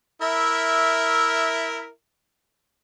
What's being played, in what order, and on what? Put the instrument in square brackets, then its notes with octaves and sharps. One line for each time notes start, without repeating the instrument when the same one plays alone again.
[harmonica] E4 A#4 E5